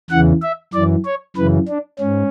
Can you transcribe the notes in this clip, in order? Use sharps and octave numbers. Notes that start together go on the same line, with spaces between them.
E2 C#3 E3 F#5
E5
F#2 E3 D5
C#5
F#2 C#3 E3 B4
D4
G#2 C#4